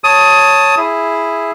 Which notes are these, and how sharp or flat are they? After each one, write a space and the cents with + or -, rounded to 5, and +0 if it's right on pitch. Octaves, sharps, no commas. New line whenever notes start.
C#5 +0 A5 +5 D#6 +15
E4 +0 G#4 +0